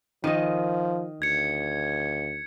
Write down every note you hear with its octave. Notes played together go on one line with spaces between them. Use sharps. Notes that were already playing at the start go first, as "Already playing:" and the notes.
D#3 F3 D#5
D2 G#6 C#7